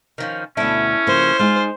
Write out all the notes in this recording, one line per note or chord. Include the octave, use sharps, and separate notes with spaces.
D#3 F3 C#4
D2 B2 C#4 D4 E4 A4
C#3 F3 A#3 C5
G#3 D#4 F4 G#5